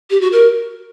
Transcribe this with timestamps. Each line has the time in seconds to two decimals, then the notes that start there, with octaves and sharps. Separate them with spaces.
0.10 G4
0.21 F#4
0.32 A#4